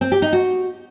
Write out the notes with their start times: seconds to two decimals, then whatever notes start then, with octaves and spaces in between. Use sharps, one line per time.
0.01 C4
0.12 G4
0.22 D#4
0.33 F#4